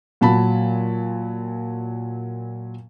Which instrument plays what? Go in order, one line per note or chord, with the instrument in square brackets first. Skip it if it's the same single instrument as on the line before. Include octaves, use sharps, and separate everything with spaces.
[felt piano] A#2 F#3 A5 B5